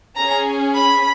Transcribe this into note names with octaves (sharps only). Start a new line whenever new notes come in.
C#4 G#4 A#5
B5